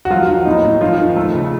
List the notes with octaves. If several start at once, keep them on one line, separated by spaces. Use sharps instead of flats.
F#4
F3 F#3 F4
D#3
A2 D#4
A2
D#3 F3 F4
D#3
A3 A4
C#3